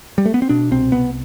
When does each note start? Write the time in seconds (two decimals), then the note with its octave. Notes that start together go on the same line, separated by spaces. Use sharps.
0.18 G3
0.25 A3
0.34 B3
0.42 C4
0.49 B2 D4
0.71 C2 C4
0.92 C2 B3